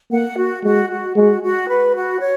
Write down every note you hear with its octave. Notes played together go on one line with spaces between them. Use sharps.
A#3 F#5
F#4
G#3 F#4
F#4
G#3 F#4
F#4
B4
F#4
C#5